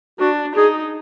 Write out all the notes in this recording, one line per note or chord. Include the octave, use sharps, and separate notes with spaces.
D4 F#4
D#4 G#4